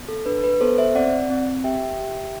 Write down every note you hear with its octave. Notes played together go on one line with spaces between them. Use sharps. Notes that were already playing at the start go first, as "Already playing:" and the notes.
Already playing: B3
A4
D4 B4
B4
B3 A4 C5
C5 E5
C4 D5 F#5
C4
G4 E5 G5
G4